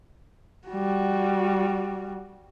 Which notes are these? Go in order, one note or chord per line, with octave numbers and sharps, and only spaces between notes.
G3 F#4